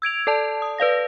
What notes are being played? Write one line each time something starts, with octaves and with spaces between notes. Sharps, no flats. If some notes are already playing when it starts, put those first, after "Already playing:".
E6 G#6 D7 F7
A4 D5 A5
D#6
B4 D5 F5 A#6